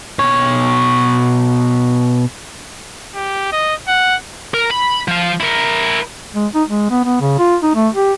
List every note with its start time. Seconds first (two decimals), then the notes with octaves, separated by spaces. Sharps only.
0.19 B2 C#5
3.15 G4
3.52 D#5
3.88 F#5
4.54 A#4
4.71 B5
5.08 F3 F5
5.41 E4 A#4
6.35 G#3
6.55 D#4
6.68 G#3
6.90 B3
7.05 B3
7.21 C#3
7.39 F4
7.63 D#4
7.75 A3
7.95 G4